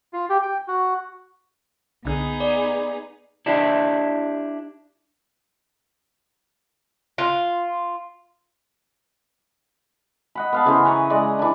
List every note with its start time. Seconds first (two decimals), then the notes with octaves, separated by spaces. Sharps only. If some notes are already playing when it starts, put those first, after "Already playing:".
0.13 F4
0.29 G4
0.43 G5
0.68 F#4
2.05 C2 D3 B3 D#4 G#4
2.40 D5
3.46 D4 E4 G4
7.18 F4
10.35 D#5 F#5 B5
10.52 B3 F5 A5
10.65 C#3 E3 G#4 C5
10.85 B4 A#5 C#6
11.10 G#3 D5 D#5
11.39 E3 D4